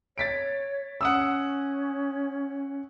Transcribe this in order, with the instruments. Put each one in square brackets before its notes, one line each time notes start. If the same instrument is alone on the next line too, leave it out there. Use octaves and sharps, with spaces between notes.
[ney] C#5 [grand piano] A6 B6 D7
[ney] C#4 [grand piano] F#5 D#6 E6